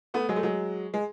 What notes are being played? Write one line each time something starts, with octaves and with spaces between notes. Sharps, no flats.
A3 B3
F#3 G#3
A3
F#3 G#3
G#3